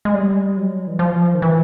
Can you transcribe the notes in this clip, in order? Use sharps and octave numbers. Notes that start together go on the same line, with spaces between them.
G#3
G3
F#3
E3
F3
D#3
E3